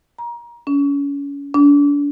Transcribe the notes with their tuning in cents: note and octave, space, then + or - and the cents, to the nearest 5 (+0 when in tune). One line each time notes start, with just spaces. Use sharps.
A#5 +25
C#4 +30
D4 -35